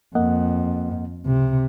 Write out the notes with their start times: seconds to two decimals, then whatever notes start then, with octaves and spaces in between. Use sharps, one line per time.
0.15 F2 A#3 D#5 F#5
1.26 C#2 C3